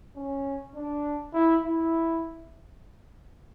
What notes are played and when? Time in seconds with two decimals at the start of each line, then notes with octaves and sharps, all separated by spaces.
0.16 C#4
0.75 D4
1.34 E4
1.63 E4